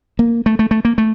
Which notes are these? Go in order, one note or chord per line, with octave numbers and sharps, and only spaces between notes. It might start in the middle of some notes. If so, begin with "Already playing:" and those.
A#3
A3
A3
A3
A#3
A3